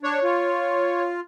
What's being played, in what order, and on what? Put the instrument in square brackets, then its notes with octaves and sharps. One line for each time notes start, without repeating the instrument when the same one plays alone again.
[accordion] D4 [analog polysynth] C#5
[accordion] F4